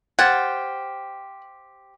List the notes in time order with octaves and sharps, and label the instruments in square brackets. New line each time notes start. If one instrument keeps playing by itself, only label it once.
[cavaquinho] G4 C5 F5 [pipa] F#5 [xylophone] G#6 A6